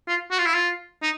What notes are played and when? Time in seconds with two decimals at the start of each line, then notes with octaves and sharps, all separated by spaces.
0.08 F4
0.31 F#4
0.38 F4
0.46 E4
0.54 F4
1.03 D#4